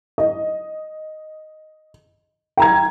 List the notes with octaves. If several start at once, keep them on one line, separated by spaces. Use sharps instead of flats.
D#5
G5 A#5 G#6